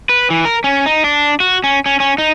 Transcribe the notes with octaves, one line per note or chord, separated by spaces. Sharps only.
B4
E3
A#4
C#4
D#4
D4
F#4
C#4
C#4
C#4
D#4